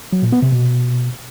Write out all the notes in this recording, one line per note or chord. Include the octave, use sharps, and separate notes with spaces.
F#3
A#2
B3
C3
B2